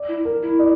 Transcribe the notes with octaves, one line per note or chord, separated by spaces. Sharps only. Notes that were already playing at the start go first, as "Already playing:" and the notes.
Already playing: D5
E4
A#4
E4
D5